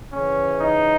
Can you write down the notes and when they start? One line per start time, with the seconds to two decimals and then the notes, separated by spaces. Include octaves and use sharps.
0.12 C#3 E3 C#4
0.62 D#4